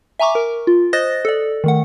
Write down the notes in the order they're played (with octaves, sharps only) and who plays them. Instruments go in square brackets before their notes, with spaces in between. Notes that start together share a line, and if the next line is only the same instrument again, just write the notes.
[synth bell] E5 G#5 A#5 C#6 D6
A#4
F4
C5 D#5 D#6 F#6 A6 A#6
A4 D5
D#3 A3 F#5